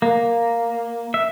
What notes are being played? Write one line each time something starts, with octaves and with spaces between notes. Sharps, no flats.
A#3
E5